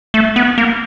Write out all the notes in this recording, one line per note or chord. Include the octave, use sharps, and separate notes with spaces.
A3
B3
A#3